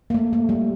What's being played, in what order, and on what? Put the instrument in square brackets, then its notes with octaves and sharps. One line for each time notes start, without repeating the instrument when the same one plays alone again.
[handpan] A#3
A3
A3
G3